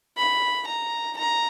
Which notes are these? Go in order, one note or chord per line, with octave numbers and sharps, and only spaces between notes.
B5
A#5
A#5